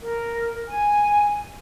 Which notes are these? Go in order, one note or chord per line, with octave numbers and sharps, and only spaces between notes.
A#4
G#5